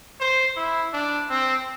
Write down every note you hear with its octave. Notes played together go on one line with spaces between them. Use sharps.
C5
E4
D4
C4